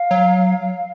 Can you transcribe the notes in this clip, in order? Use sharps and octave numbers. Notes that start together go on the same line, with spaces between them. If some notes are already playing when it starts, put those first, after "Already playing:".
Already playing: F5
F#3